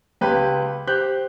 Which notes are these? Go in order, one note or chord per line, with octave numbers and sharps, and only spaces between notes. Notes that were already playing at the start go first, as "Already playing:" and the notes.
C#2 G4 B4 G5
G4 C5 F#6 G6